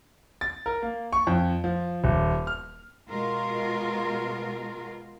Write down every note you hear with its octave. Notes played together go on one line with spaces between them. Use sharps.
A6
A#4
A#3
C#6
F2
F3
D#1
F6
B2 G#3 F4 A#4